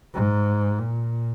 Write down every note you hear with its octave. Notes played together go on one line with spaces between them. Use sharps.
G#2
A#2